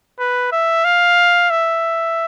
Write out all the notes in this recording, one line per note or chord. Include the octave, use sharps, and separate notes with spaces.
B4
E5
F5
E5